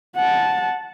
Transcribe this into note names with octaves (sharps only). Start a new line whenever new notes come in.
F#5 A5